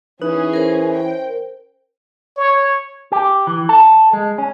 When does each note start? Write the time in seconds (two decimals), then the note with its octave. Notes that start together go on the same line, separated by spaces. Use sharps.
0.22 E3 C#4 D#4 G#4 B4
0.53 A#4 C5
0.92 G5
2.37 C#5
3.12 G4
3.47 E3
3.69 A4
4.13 G#3
4.38 C#4